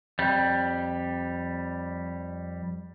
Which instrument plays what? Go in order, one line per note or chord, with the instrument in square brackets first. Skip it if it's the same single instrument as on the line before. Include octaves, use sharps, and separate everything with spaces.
[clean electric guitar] F2 G3